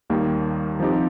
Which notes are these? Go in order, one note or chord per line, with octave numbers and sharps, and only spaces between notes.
D#2 D#3 G3 A#3
F3 C4 D#4 G4